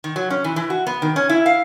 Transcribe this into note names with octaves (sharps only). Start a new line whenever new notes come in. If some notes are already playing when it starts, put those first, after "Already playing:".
D#3
F#3
C#4
E3
E3
F#4
B3
D#3
C#4
E4
F5